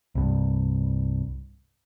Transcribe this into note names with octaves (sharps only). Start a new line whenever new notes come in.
C2 G2